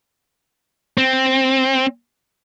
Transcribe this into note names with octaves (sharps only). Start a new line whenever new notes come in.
C4